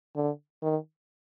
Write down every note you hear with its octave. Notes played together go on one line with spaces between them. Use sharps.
D3
D#3